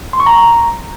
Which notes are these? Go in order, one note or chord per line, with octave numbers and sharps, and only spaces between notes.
C6
C#6
A#5